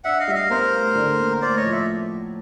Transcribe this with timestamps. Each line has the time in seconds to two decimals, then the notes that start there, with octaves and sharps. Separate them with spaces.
0.04 D4 E5 F#5
0.20 D#5 F5
0.28 G3 E5
0.35 D#5 F5
0.50 B3 A#4 C5
0.73 A2
0.95 D3
1.19 A#3
1.42 A2 C5 D5
1.57 C#5 D#5
1.65 F3
1.72 D5 E5